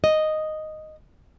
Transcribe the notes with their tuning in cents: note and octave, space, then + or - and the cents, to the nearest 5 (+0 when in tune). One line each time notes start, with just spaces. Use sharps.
D#5 -5